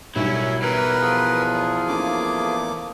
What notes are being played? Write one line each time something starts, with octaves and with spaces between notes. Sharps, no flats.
B1 F#3 G3 C#4 E4
E2 E3 A#4 B4
F3 G#4
A3 A#3 C#4 D#4 D6